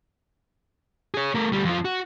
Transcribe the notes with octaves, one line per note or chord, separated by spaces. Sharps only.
G#4 C#5
A3 A#4
D2 G3
F2 F4
F#4